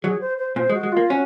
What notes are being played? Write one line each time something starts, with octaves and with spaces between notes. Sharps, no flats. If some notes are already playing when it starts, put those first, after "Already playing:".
F#3 G#4
C5
C5
A#2 C5
G#3
F#4
G#3
A#3 F4
C#4 F#4